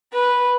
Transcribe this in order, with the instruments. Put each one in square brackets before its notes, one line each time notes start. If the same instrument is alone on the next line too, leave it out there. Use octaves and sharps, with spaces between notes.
[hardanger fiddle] B4